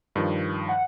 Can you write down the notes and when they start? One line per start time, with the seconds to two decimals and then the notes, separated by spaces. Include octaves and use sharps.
0.16 G2 D#3 F3
0.69 F#5